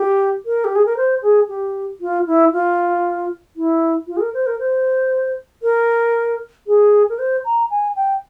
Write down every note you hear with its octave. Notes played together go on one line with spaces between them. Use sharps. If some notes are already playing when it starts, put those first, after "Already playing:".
Already playing: G4
A#4
G4
G#4
A#4
C5
G#4
G4
F4
E4
F4
E4
F4
G#4
A#4
C5
A#4
C5
A#4
G#4
A#4
C5
A#5
G#5
G5